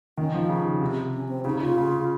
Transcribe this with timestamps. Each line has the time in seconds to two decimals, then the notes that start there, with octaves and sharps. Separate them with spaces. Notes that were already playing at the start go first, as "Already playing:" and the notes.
0.18 D#3 C#4
0.34 F3 D#4
0.49 C#3
0.81 C3
1.14 C#4
1.29 C4
1.45 C#3 D#4
1.55 C#3
1.62 F4
1.67 C#3
1.77 C#3